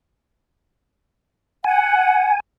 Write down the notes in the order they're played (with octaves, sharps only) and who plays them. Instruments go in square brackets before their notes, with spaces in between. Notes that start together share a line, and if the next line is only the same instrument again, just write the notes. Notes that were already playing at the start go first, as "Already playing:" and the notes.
[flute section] F#5 [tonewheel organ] G#5